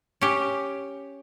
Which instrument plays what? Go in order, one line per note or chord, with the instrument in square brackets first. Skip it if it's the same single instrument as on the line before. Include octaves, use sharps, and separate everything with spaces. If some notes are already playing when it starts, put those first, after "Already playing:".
[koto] C#4 G4